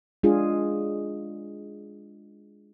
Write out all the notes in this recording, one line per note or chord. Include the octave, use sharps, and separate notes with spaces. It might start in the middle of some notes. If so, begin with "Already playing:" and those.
G#3 D4 F4 G#4